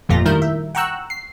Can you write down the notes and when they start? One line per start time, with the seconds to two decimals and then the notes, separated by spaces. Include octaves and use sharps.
0.09 G1 F2 A#2 A3 F4 A#6
0.25 D#3 G3 E4 A#4 G6
0.42 E5
0.75 F#5 G5 A#5 C#6 E6 F#6
1.10 C7